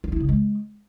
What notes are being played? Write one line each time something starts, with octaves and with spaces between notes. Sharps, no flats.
F4
E4
C#3
G#3